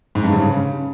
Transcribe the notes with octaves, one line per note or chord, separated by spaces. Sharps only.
G#2
G2
C#3